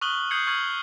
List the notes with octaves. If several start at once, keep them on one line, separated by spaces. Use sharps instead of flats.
C#6 D#6 F6 F#6 F#7 G7
D#6 G6 G#6 C7 C#7 F#7
C#6 F6 G#6 F#7